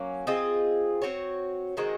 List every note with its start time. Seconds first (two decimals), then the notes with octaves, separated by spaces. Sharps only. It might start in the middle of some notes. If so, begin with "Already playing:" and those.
Already playing: F#3 A#3 C#4
0.27 C4 F4 G#4 D#5
1.02 C4 F#4 C#5
1.77 D#3 G#3 C4 F#4